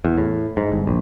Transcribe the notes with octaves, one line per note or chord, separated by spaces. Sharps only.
E2
A2
G#2
G1
A#1